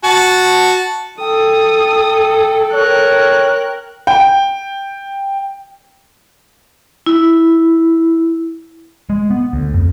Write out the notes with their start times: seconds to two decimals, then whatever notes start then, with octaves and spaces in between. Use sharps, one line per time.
0.04 F#4 A5
1.20 A4 G5 D#6
2.73 A#4 C#5 F#6
4.07 G5
7.06 E4
9.10 G#3
9.31 B3
9.53 D2
9.74 F2